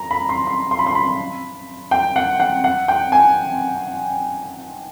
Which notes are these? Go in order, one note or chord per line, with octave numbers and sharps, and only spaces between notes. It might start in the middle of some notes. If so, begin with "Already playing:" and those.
Already playing: A#5
B5
C6
C6
C6
B5
C6
B5
G5
F#5
F#5
F#5
G5
G#5